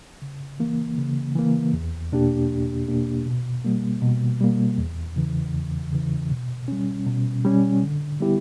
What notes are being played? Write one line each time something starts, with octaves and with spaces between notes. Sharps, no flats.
C#3
E3 A#3
C#3
E3 A#3
E2
B2 A#3 D4 G4
E2
B2 A#3 D4 G4
B2
G3 A#3
B2
G3 A#3
E2
C#3 E3
E2
C#3 E3
B2
G3 C#4
B2
G3 C#4
D3
G3 B3 E4 G4